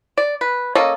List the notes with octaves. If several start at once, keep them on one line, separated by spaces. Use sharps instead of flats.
D5
B4
A#3 C#4 A4 D#5